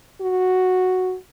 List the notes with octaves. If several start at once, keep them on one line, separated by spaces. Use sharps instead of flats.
F#4